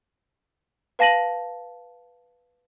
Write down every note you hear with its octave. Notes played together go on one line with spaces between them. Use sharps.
B4 F5 A5 A#6 D#7 F#7